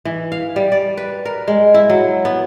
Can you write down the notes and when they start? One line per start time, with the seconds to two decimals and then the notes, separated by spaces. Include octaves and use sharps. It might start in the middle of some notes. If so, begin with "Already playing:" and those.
0.05 E3
0.32 F5
0.56 G3
0.72 D5
0.97 B4
1.25 A#4
1.48 G#3
1.74 E4
1.90 F#3
2.25 B3